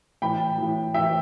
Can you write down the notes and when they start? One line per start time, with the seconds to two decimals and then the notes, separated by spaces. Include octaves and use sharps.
0.22 A2 E3 G5 B5
0.58 A2 E3
0.94 A2 E3 E5 G5